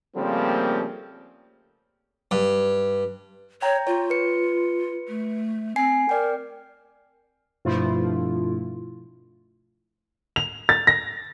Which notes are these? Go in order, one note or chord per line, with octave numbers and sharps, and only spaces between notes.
C#3 F3 G3 A3 A#3 C4
G2
C#5 G5 A#5
F4 C#5
B4 C#7
A3
C4 G#5 C7
A#4 D5 G5
G2 B2 F3 A3 E4 F4
F7
A6
A#6